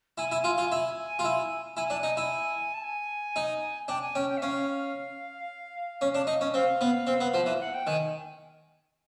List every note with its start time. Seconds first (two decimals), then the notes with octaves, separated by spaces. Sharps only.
0.18 E4 G#5
0.31 E4
0.44 F4
0.58 F4
0.72 E4
1.19 F4
1.25 E4
1.76 E4 G#5
1.90 D4
2.03 D#4
2.17 E4
2.74 A5
2.83 G#5
3.36 D#4
3.88 D4 G5
4.02 G#5
4.15 C#4 G5
4.29 G5
4.37 E5
4.42 C#4 F5
6.01 C#4
6.15 D4
6.27 D#4
6.41 C#4
6.54 C4 F5
6.81 B3
7.07 C4
7.21 B3
7.34 F3
7.46 E3
7.60 F#5
7.74 G5
7.87 D#3 G#5